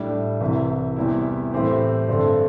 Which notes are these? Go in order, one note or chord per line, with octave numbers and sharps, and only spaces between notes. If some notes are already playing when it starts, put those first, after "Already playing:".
Already playing: A2 G3 D4
C2 C3 E3
E2 C3 G3 E4
A2 E3 C4 G4
G2 D3 C4 A4